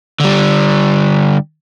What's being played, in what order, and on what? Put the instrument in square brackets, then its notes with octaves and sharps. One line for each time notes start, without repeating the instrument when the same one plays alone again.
[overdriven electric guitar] D3 G3